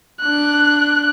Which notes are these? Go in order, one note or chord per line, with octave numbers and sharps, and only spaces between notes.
D4 F#6